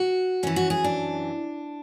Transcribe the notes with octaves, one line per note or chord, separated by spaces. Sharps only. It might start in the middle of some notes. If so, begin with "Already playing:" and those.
Already playing: F#4
F#2 E3 C#4
F#4
G#4
D4